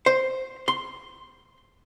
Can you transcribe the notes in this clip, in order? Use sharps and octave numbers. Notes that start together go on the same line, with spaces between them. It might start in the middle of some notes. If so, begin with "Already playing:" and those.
C5
C6